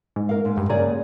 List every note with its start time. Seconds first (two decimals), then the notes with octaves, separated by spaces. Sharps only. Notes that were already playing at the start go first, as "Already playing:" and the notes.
0.16 G#2
0.29 A#4 F5
0.45 G#2
0.57 G2
0.69 C#3 A#3 G#4 D5